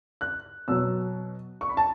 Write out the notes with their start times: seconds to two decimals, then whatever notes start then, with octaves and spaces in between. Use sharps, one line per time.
0.21 F#6
0.68 B2 F#3 E6
1.61 C#6
1.69 B5
1.77 A5